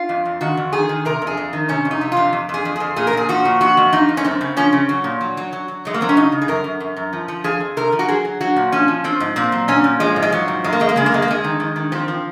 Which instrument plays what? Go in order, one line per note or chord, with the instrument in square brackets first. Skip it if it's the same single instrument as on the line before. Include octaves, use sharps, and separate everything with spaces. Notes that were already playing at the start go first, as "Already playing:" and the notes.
Already playing: [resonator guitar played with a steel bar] F4
F2
F2
D#3 F#4
F2
D#3 G#4
D#3
C3 A#4
F2
G#4
F2
D#3
C3 C#4
F2
D#4
C3
F2 F4
F2
F2 G#4
F2
F2 G#4
A#2 G#4
A#4
A#2 G#4
F3 F#4
A#2
F2 F#4
F2
F2 D#4
F2
C#4
F#2 C4
C#3
F3 C#4
C#3
F#3
A#2
F#3
F#3
F#3
F#3
F#3 G#3
A#3
F#3 C4
C#4
C#3 D#4
C#3
G#4
F#2 A#4
F#2
F#2
F#2
F3
F3
F3 G#4
F2
C3 A#4
F3
F#4
F#3 G#4
F#3
F#3 F#4
A#2
F3 C#4
F3
F3 C4
G#2
A#2 C4
F#3
A#2 C#4
A#2
F3 G#3
G#2
G#3
F3 F#3
G#2
F#2 G#3
A#3
F#2 G#3
A#3
C#3 G#3
A#3
F#2 G#3
A#3
F2 G#3
D#3
D#3
D#3
F3 C4
F3